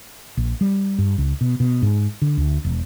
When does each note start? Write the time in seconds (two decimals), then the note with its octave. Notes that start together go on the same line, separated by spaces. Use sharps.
0.37 A#1
0.61 G3
0.98 G2
1.18 C#2
1.41 B2
1.60 B2
1.82 G#2
2.22 D3
2.38 D2
2.64 E1